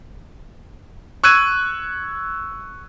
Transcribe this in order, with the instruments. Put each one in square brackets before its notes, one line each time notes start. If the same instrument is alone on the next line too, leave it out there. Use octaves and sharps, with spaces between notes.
[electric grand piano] C#6 E6 F#6 G#6 D#7